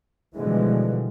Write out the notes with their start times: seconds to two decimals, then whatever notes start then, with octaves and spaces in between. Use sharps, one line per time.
0.35 B2 D3 E3 F3 G3 G#3